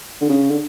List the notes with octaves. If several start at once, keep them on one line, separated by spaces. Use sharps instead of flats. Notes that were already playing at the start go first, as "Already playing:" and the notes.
D3
C#3
D3